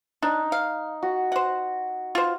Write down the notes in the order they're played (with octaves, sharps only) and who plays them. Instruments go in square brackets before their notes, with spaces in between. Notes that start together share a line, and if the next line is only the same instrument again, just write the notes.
[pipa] D4 [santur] D#4
[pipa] F5
[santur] F#4
[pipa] C5 F#5
F4 C5